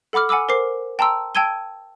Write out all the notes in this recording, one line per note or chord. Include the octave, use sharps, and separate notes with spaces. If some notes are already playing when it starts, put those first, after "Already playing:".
A4 F#5 B5 D6 F6
F#5 G#5 B5 D6 E6
A#4 C5 D6 C7
G5 A5 A#5 C6 E6
G5 A5 E6 G#6 D#7 G7